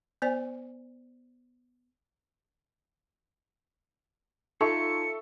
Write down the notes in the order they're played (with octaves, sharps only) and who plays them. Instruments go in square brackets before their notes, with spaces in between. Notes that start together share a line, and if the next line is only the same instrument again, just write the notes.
[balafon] B3 C5 D5 G#5
[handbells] D#4 F4 [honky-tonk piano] A4 E5 C#6 [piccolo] C#7